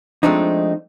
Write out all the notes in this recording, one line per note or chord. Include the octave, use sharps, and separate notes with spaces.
F3 G#3 A3 C4 D4 D#4